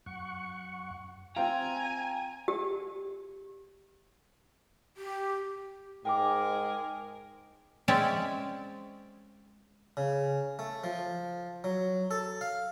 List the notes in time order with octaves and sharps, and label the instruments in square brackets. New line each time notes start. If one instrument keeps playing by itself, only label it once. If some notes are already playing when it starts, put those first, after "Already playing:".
[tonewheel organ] F#2 F#5 C#6
[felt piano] C4 F4 [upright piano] G5 [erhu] G#5 [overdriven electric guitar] A#5
[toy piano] G4
[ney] G4
[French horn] G#2 [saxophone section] G#3 G#4 A#4 [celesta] G5 G#5 D6
[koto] G#3 C4 C#4 C#5 D5 E5
[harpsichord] C#3
A3
F3
F#3
A4
F5